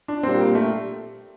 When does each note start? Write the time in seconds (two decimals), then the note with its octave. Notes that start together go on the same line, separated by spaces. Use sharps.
0.08 D4
0.23 A#2 G3 C4 D4 G4
0.39 A#3
0.55 A3